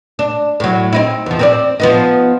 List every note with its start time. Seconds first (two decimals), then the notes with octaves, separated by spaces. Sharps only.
0.19 D4
0.60 A2 F#3
0.93 C4 D#4 E4
1.26 E2 F3
1.39 C4 A#4 D5
1.80 F3 B3 D#4